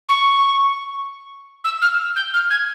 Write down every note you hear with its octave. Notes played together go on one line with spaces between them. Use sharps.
C#6
E6
F6
G6
F6
G#6